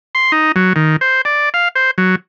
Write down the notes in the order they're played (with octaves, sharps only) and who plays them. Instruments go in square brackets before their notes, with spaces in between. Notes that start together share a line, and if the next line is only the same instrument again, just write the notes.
[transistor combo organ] C6
D#4
F#3
D#3
C5
D5
F5
C5
F#3